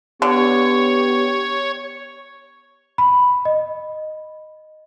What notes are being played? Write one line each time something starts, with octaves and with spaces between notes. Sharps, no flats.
D3 B3 G4 C#5
B5
D#5